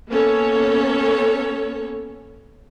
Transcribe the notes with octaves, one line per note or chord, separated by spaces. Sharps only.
A#3 B3 C#4 A4 C#5